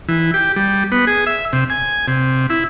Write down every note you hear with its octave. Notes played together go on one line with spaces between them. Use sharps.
E3
G4
G3
B3
G#4
E5
C3
G#5
C3
E4